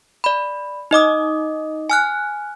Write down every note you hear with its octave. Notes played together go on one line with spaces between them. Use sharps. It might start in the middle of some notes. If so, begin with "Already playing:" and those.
D5 B5
D#4 D#5 D6 D#6
G#5 F6 F#6